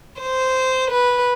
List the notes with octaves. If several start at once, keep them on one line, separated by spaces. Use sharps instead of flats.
C5
B4